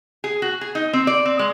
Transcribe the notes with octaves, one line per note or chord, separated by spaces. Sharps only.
G#4
F#4
G#4
D#4
C4
D5
C4
G#3